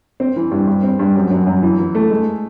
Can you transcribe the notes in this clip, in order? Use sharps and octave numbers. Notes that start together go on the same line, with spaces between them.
C4
E3
G2
G2
C4
G2
F#2
F#2
F#2
E3
E3
A3
G#3